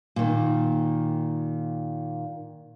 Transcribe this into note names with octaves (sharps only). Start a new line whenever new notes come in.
A#2 D#3